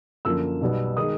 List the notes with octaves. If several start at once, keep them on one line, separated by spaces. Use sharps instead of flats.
F#2 D3 F3 A#3 E6
B1 B2 G3 B3
D#3 G#3 D#6